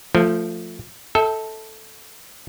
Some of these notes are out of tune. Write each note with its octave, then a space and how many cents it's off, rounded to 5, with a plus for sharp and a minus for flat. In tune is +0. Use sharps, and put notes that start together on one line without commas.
F3 +0 A3 +20
A4 +0 E5 -35 G5 +0